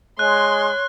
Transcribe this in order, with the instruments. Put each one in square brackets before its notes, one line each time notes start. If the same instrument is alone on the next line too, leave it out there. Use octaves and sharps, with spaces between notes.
[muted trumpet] G#3 [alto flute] C#5 [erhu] C6 [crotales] F#6